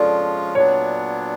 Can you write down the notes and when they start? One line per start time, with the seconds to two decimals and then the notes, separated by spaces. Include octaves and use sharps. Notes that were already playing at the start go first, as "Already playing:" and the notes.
Already playing: F3 G#3 C#4 F4 A4 D5
0.55 A#2 F#3 B3 D4 C#5